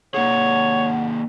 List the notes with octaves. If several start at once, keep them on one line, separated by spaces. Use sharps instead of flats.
A#3 D#4 G#4 C#5 F#5